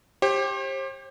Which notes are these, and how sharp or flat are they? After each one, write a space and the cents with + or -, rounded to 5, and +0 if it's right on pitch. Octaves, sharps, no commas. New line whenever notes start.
G4 +10 C5 +40